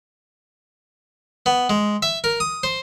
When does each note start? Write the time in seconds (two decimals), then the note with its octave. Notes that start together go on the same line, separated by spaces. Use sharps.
1.46 B3
1.70 G#3
2.03 E5
2.24 A#4
2.40 D#6
2.63 C5